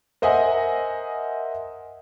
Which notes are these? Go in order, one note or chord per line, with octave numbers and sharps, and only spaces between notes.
A#4 C5 D#5 E5 F#5 G#5